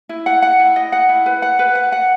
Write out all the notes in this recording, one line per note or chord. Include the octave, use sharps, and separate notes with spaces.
E4
F#5
F#5
E4
D#5
F#5
E4
B4
F#5
B4
F#5
F#5